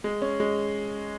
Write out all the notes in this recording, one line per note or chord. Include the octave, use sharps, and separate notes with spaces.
G#3
C#4
G#3